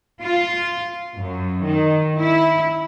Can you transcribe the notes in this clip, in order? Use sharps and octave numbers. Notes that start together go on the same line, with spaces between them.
F4
F#2
D#3
E4